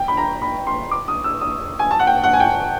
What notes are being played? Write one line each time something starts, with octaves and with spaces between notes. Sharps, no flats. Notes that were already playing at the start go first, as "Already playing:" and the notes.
Already playing: G5
B5
A#5
B5
C6
D6
D#6
E6
D#6
G#5
A5
F#5
G5
F#5
G#5
G5